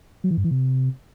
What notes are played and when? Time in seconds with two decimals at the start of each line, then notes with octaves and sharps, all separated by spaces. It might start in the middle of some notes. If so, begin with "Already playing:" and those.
0.24 F#3
0.31 E3
0.37 G2
0.44 E3
0.51 C3